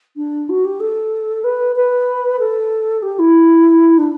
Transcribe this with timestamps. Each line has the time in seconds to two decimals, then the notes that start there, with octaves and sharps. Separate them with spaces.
0.16 D4
0.49 F#4
0.65 G4
0.80 A4
1.44 B4
1.76 B4
2.39 A4
3.02 G4
3.19 E4
3.98 D4